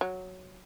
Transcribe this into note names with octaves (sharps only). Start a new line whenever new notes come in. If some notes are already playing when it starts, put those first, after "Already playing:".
F#3